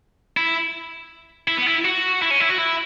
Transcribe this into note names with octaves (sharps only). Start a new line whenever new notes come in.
E4
E4
B3
E4
F#4
E4
C#4
E4
F#4
E4